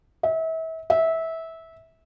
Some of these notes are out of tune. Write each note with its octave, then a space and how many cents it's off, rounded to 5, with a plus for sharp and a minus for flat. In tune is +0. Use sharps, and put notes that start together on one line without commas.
E5 -35
E5 -20